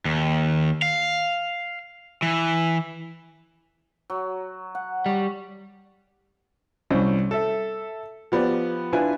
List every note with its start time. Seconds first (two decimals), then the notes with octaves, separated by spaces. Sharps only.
0.05 D#2
0.82 F5
2.22 E3
4.10 F#3
4.75 F#5
5.06 G3 G4 C#6
6.90 C2 C#4 C5
7.31 A4 E5
8.32 F3 B3 G4 D5
8.93 D4 E4 F4 B4 G#5